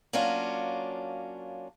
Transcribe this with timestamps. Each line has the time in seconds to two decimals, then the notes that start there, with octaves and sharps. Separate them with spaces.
0.13 F#3 A#3 C#4 D4 F4